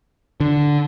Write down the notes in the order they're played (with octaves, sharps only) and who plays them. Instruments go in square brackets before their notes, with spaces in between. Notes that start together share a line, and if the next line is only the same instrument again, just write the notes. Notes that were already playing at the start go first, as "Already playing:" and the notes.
[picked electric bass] D3